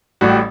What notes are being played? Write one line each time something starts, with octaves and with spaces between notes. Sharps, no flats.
A1 A2 G3 F#4